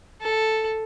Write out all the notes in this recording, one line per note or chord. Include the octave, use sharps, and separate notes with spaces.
A4